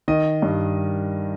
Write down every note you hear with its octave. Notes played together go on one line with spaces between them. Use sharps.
D#3 D#5
G2